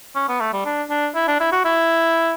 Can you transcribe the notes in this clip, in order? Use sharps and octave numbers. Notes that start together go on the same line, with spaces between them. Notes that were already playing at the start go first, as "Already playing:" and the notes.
C#4
B3
A3
G3
D4
D4
E4
D4
E4
F#4
E4